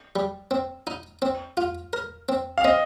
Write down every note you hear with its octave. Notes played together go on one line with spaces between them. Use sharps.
G3
C4
D#4
C4
F4
A#4
C4
F5
C4 D#5